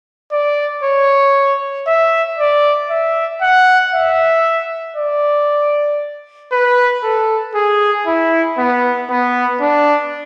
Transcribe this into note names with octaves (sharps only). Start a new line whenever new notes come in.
D5
C#5
E5
D5
E5
F#5
E5
D5
B4
A4
G#4
E4
B3
B3
D4